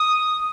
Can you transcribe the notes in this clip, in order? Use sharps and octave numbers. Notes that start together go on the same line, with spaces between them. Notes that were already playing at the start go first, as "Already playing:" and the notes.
Already playing: D#6